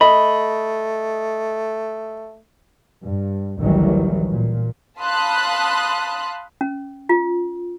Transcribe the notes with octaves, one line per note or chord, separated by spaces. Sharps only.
A3 D#5 B5
G2
A1 D2 D#3 E3 F#3 G3
A#2
F5 A5 B5 C6 D#6 F#6
C#4
F4